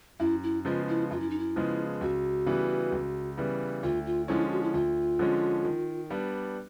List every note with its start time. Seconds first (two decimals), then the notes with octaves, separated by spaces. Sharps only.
0.20 F#2 E4
0.43 E4
0.65 C#3 F3 G#3 B3 F4
0.88 E4
1.11 F#2 F4
1.20 E4
1.30 D#4
1.39 E4
1.56 C#3 F3 G#3 B3
2.01 C#2 F#4
2.46 C#3 E3 G3 B3
2.92 C#2
3.38 C#3 E3 G3 B3
3.83 D2 F4
4.06 F4
4.28 D3 F3 G#3 C#4 E4
4.51 F#4
4.63 E4
4.73 D2 F4
5.19 D3 F3 G#3 C#4
5.65 D#3
6.10 G3 B3 D4